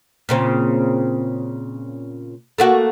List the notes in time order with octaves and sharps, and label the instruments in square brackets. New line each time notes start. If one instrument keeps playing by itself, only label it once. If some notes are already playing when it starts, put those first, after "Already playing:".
[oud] A#2 C#3 C4
A3 A#3 F#4